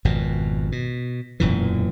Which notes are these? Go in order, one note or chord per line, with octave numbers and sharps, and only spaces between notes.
G#1 F2 B2
B2
E1 F#2 A#2 E3